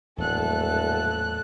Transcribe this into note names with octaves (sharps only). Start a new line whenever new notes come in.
D#1 E2 A2 F#3 A4 F#6